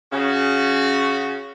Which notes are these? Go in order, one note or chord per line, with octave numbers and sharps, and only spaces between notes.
C#3 C#4 F#4